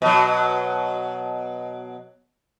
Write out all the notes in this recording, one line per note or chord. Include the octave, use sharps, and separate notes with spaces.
B2 F#3